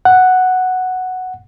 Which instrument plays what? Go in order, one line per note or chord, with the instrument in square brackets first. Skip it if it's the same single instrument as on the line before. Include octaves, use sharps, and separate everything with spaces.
[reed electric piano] F#5